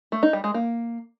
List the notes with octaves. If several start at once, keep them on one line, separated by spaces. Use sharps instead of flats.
A3
D#4
G3
G#3
A#3